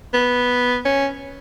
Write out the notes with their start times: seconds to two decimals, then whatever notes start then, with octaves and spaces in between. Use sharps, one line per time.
0.14 B3
0.85 C#4